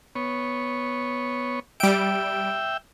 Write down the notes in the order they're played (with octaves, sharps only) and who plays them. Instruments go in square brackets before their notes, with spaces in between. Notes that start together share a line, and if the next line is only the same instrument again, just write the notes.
[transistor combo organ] B3 C#5
[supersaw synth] G3 D7 [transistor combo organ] E5 G5